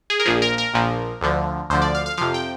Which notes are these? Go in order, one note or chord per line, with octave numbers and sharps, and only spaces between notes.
G#4
A#4
A#1 A#2 F3 G#4
A#4
A#4
A#1 A#2 F3
D2 D3 F3
D2 D3 F3 C5
D5
F5
F5
F2 C3 F3 F5
G5